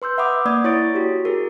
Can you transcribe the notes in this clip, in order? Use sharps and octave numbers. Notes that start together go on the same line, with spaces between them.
B4 C6 E6 G6
E5 F#5 B5 D6 D#6
A#3 D5 D#6 G#6
E4 C#5 C#6 A6 D7
F#4 G4
G#4 A#4